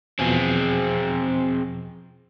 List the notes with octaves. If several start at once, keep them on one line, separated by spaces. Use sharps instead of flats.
E2 B2 F3 C4 G#4